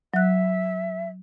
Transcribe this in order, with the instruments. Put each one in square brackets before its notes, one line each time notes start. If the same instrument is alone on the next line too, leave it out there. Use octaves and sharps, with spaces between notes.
[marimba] F#3 F#6 [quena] E5